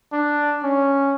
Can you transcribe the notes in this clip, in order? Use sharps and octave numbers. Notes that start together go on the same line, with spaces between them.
D4
C#4